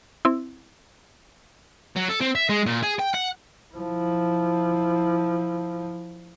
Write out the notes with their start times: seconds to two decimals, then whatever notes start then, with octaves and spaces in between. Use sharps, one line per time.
0.25 C4 E4
1.96 F#3
2.09 A4
2.21 C4
2.35 E5
2.49 G#3
2.66 A#2
2.83 G#4
2.99 G5
3.14 F#5
3.74 F3 E4